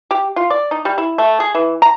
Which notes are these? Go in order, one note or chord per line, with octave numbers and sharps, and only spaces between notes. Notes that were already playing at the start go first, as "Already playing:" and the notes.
G4
F4
D5
D#4
G3
E4
A3
G#4
E3
A#5